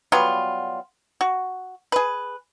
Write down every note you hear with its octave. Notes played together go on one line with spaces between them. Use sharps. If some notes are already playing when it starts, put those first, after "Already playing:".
F#3 G3 B3 F4
F#4
G#4 B4